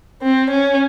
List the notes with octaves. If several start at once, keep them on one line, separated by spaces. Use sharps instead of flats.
C4
C#4